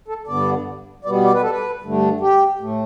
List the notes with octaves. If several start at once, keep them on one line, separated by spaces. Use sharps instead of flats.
A4
G2 D3 B3 D5
B2 G3 B3 D5
D5
B4
A4
B4
G2 D3 A3
G4
A2 A3